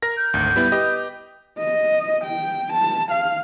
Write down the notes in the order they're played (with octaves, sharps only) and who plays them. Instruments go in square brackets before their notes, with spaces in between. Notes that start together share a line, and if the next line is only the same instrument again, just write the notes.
[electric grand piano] A#4 A#6
[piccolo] G6
[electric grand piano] G#1 D2
G3 B3 E4
G4 B4 D#5
[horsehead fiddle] D#5
G5
A5
F5